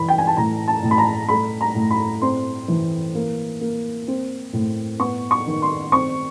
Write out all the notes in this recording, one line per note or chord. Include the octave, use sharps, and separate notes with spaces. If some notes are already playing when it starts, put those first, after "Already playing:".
Already playing: E3 B5
G5
G#5
A5
A2 A#5
A5
A2
B5
A#5
A3 B5
A#5
A2
B5
C4 C6
E3
A#3
A#3
C4
A2
B3 C#6
C#6
D#3
C6
C4 C#6